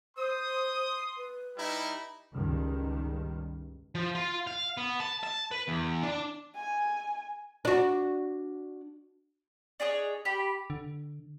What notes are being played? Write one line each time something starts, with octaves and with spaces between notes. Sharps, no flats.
C5 C6 D#6
B4
G3 D#4 E4
C#2 G2 D#3
F3
F4
F5
B3
A5
A5
B4
E2
D4
G#5
D4 F#4
D4 G#4 C#5 D#5
G4 B5
D3